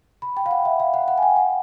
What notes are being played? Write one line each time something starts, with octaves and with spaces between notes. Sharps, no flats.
B5
G5
F5
F#5
E5
F5
F#5
F#5
G#5
G5
F#5